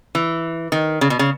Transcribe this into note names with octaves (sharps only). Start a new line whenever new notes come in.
E3
D#3
C#3
B2
C#3